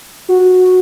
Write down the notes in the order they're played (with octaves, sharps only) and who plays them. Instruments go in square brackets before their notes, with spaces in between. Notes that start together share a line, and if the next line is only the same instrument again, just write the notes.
[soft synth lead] F#4